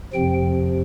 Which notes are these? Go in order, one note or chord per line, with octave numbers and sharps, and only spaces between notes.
F2 C3 F3 G5